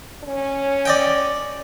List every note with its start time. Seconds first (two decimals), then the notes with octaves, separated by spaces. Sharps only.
0.24 C#4
0.86 D5 D#5 G5